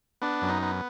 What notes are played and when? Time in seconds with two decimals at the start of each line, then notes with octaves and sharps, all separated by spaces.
0.22 B3 D4
0.42 F#2
0.49 D#4
0.63 B3